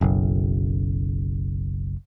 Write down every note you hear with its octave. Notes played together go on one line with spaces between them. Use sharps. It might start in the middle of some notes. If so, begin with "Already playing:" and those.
F#1 B1 F#2